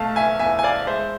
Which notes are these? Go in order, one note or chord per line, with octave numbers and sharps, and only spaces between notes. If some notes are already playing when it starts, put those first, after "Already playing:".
Already playing: B1 A3 F5 A5
E5 G#5
E2 E5 G#5
G#5
D5 F5
G#3 C5 E5